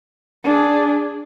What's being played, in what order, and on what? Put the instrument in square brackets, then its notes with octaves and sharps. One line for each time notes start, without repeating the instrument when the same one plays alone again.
[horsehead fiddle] D4 G#4